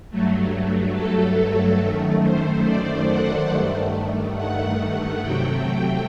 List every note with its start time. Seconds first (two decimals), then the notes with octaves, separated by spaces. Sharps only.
0.10 G2 F#3 A3
0.95 A4
1.80 F#2 D#3 A3
2.23 C5
2.66 D5
3.09 F#5
3.51 G2 D#3 A3
4.37 F#5
4.79 F#5
5.22 C3 F#3 A3 G5